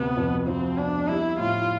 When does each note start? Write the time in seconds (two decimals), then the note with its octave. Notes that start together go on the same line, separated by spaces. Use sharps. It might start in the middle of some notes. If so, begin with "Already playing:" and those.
Already playing: D2 C3 B3
0.17 F2
0.47 F3 C4
0.77 B3 D4
1.08 G3 E4
1.39 A2 F4